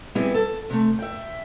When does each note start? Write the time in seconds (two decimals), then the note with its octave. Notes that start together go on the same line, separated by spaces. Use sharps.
0.15 G3 B3 C4 E4 G4 G#4
0.34 A4
0.70 C3 A3
0.99 E5 G5